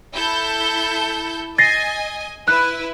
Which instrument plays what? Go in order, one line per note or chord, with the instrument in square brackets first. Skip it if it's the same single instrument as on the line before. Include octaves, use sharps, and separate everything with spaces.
[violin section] E4 A4 G6
[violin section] D#5 G#5 [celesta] A6 A#6 C7
[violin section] E4 B4 [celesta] F#6